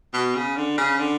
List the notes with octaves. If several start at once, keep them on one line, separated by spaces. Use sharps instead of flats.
B2
C#3
D3
C#3
D3